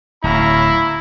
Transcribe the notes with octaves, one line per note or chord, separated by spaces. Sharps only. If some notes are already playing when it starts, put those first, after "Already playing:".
D1 C#4 E4 F5 A#5 B5